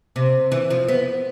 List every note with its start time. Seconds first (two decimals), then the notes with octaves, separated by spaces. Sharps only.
0.16 C3
0.52 E3
0.70 F3
0.88 B3